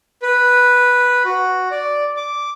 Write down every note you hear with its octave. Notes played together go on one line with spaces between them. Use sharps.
B4
F#4
D5
D6